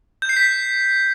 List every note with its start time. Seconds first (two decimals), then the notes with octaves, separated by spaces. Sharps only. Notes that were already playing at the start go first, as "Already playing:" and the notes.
0.22 G6
0.29 C7
0.36 B6